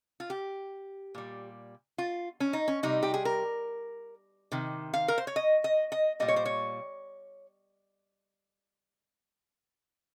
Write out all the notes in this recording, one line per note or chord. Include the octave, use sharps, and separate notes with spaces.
F4
G4
A#2 G3
F4
C#4
D#4
C#4
C3 G3 D#4
G4
G#4
A#4
C3 D#3
F5
A#4
C5
C#5
D#5
D#5
D#5
A#2 G3 D#5
C#5
C5
C#5